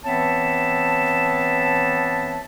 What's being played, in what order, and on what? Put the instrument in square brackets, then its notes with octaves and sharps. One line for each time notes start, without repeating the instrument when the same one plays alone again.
[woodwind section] E3 B3 C4 C#5 E5 A5